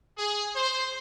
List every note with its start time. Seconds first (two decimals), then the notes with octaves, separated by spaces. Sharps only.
0.18 G#4
0.56 C5